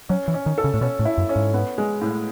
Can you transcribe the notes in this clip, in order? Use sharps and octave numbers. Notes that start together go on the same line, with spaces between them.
F#3 C#4
E3
C#4
D#3
A4
C#3
A2
B2 C#4
A2
E4
F#2
C#4
G#2
B3
G#3
A2